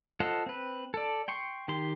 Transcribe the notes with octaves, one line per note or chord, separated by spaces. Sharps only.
F4 A4 C5 D#5 F#5
C4 B4
A4 D5
G5 C6 C#6
D#3 G4 C6